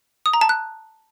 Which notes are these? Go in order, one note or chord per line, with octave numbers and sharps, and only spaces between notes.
D#6
A#5
A5
F#6